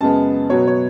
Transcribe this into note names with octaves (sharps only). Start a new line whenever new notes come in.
F#2 C#3 G#3 B3 A5
B2 F#3 B3 C#5
C#5